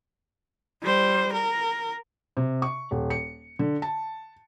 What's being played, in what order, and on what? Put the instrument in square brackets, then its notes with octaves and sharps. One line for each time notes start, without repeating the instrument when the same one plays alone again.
[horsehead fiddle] G3 C5
A#4
[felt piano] C3
C#6
D#1
C#7
D3
A5